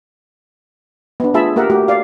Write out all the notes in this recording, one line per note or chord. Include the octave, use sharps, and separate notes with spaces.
B3 D4
A3 F4 G#4 E5 A5 B5
A#3 G4 A#4 E5 F#5
A3 F#4 G4
D5 F5